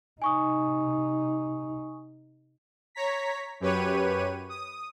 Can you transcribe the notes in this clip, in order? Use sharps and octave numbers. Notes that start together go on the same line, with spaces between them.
C3 D#4 G#5 C#6 D#6
C#5 A#5 B6
F#2 G4 B4 C#5 D#7
D#6